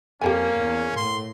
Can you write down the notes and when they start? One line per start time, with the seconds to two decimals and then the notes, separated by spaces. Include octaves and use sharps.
0.21 F2 A#3 C#4 G4 A4 G#5
0.59 E2
0.96 A2 C6